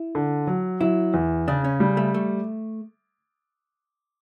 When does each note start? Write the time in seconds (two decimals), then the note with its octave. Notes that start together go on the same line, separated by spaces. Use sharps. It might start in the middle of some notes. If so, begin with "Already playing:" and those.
Already playing: E4
0.15 D3
0.47 F#3
0.81 F#3 E4
1.14 E2
1.48 C#3 D4
1.64 C#4
1.80 G3
1.97 A3
2.14 A3